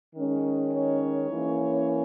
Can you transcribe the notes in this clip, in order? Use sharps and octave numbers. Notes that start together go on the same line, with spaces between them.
D#3 G#3 C#4
C#5
E3 A#3 C#4